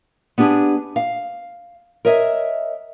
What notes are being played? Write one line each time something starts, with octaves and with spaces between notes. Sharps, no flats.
B3 D4 G4 G#4
F5
A#4 C#5 D#5 E5